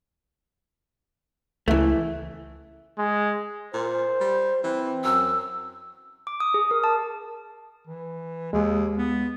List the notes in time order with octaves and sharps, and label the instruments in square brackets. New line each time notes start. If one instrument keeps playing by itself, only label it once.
[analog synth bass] C#2 [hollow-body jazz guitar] E3 A3
[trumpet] G#3
[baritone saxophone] A#2 [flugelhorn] C5
[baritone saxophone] G3
[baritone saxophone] E3 [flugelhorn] C4
[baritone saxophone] F#2 [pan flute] E6
[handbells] D6
D#6
G#4
A#4
A5
[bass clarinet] E3
[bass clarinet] D#2 [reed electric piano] G#3
[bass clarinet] B3